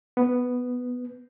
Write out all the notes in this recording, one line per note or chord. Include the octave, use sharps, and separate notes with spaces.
B3